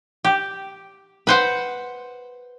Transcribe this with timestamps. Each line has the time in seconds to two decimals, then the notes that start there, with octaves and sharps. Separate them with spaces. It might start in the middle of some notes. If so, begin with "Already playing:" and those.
0.24 G4
1.27 B4 C5 F#5